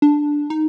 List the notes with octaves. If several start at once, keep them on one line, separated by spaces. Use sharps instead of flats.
D4
D#4